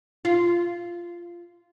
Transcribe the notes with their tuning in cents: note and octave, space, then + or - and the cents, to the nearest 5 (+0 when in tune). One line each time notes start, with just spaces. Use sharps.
F4 -15